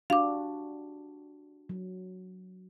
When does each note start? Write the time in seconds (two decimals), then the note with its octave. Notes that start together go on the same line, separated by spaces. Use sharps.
0.10 D4 F#4 G4 F5 D6
1.69 F#3